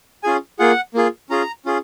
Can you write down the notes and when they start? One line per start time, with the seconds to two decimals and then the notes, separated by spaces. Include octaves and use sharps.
0.23 C#4 F4 G#4 G#5
0.59 A#3 F4 G#4 F#5
0.94 A#3 F4 G#4
1.30 C#4 F4 G#4 A#5
1.66 C#4 F4 G#4